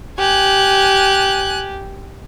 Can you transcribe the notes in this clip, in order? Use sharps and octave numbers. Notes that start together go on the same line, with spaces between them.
G4 G#5 F#6